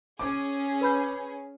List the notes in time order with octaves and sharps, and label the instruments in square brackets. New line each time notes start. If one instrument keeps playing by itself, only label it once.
[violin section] C#4 G#4 [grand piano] D6
[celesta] B4 B5 G6